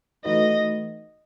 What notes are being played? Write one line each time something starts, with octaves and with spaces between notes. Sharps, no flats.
E3 A3 D#4 F#4 B4 D#5